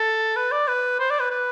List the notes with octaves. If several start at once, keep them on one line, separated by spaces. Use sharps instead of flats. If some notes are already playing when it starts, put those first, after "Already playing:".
Already playing: A4
B4
D5
B4
C5
D5
B4
B4